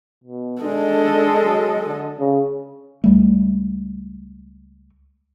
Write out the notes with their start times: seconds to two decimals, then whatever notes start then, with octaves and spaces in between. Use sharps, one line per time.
0.24 B2
0.62 G#3 D4 A4 D#5
1.43 F#3
1.86 D3
2.19 C#3
3.04 C#2 G3 A3